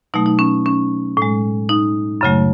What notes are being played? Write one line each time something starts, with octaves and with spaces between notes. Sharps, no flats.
B2 F#3 A3 D#4
D#4
C#4
C#4
A2 G#3
D#4
F#2 C#3 F#3 A3